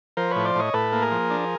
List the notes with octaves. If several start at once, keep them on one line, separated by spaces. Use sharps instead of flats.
F3 A#4 C5
A2 B4 C#5
C5 D5
A2 C#5 D#5
A2 A4 B4
A#3
G#4 A#4
F3
D4